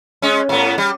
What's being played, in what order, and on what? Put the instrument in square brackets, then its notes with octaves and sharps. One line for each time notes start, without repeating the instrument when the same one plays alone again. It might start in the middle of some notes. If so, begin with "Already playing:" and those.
[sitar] G#3 C#4
A2 B3
G3